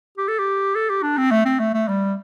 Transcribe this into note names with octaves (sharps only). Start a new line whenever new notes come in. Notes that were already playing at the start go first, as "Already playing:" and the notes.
G4
A4
G4
A4
G4
D4
C4
A3
C4
A3
A3
G3